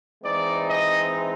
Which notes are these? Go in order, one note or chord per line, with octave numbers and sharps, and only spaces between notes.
E3 G#3 C4 D#4 D5
D#5